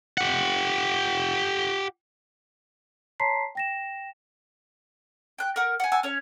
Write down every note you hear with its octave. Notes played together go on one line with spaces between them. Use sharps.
G4 F#5
C#5 A5 A#5 C6 B6 C7
G5 A#6 E7
G5 F#6
A#4 F#5
F#5 G#5
F#5 G#5 A5 E6
C#4 C#5